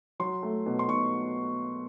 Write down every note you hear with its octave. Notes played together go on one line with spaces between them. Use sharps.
F#3 C6
A3
B2
C6
B2 C#6